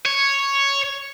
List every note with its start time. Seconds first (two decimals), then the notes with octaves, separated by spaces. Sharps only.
0.06 C#5